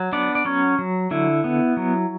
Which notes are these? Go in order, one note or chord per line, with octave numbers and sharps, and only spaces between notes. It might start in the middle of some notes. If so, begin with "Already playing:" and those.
Already playing: F#3
B3 D4 D5
D5
F#3 C#4 C#5
F#3
D3 E4
B3
F#3